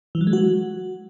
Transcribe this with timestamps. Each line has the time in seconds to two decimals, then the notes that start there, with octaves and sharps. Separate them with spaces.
0.15 E3
0.21 F#3
0.27 G#3
0.33 F#4